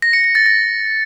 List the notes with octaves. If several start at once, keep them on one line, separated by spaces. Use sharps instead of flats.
A#6
C#7
A#6
A6
A#6